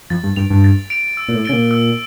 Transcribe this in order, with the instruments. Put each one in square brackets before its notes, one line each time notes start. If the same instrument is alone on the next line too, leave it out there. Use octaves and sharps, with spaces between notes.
[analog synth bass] F2 [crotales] A6
[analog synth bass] G2
[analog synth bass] G2 [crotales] D7 F7
[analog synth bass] G2
[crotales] A6
D7 F7
E6
[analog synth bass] A#2
A2
[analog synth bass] C#3 [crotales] A6 D7 G7
[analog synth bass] A#2
[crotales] E6